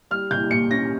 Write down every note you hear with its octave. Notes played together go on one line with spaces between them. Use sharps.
G3 F6
C2 G6
A#2 C#7
C#4 A#6